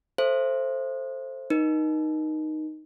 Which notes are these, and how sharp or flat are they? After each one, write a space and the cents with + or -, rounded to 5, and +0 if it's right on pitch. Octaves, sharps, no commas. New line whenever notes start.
A4 +0 C5 +10 E5 +30
D#4 -5 A#4 +40